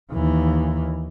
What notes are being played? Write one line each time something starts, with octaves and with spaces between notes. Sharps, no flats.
D#2 E3